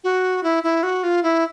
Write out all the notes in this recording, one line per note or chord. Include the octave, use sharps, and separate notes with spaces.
F#4
E4
E4
F#4
F4
E4